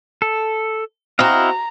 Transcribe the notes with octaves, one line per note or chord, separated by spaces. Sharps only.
A4
C4 E4 F#4 D#5 F5 A#5